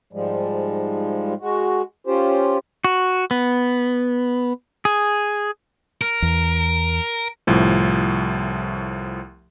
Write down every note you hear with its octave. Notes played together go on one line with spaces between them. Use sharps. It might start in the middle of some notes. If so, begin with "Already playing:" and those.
G#2 F3 G3 G#3
G#3 F#4
C#4 F4 G4 C5
F#4
B3
G#4
A#4
E2
C2 A2 F3